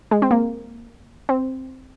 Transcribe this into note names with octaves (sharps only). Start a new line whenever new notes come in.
G#3
C4
A#3
C4